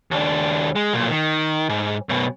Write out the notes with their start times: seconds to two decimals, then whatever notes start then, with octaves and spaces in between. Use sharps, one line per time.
0.11 D#2 D4
0.76 G#3
0.93 B1 A#2
1.10 D#3
1.69 G#2
2.09 F#2 B2